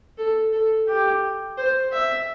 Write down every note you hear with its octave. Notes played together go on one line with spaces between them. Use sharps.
A4
A4
G4
C5
E5